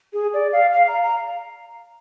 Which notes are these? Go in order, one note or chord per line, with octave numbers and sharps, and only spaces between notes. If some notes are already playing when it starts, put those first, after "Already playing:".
G#4
D5
F5
F5
A#5
A#5